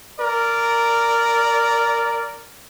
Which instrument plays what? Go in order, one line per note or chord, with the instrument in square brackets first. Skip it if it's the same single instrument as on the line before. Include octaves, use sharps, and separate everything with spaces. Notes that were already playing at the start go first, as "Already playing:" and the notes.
[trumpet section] A#4 D5